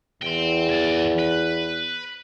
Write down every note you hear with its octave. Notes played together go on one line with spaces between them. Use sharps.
E2 G5 C6
E3 D5
B4